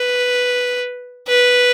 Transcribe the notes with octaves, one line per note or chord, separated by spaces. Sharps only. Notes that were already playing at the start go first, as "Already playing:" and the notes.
Already playing: B4
B4